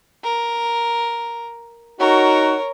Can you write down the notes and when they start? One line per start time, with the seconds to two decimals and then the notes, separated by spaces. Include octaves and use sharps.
0.24 A#4
2.00 D#4 F#4 A#4 C#5